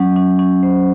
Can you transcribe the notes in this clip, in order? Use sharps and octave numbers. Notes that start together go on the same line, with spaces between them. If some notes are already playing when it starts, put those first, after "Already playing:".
Already playing: F#3 C#4
C#4
C#4
C5